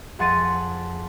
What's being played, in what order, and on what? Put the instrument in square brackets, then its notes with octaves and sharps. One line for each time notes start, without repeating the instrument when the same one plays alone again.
[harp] F2 G#4 F#5 C6 A6 D#7